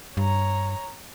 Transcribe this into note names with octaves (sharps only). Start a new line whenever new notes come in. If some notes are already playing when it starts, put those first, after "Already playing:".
G2 C#5 A#5